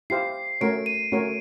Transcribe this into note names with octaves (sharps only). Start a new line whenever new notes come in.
E4 G4 C5 F5 C7
A3 C#4 F#4 A#4 C#5 D7
D#7
A3 C#4 F#4 A#4 C#5